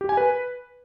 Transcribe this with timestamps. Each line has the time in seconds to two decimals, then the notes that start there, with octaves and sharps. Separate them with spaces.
0.01 G4
0.09 G#5
0.17 B4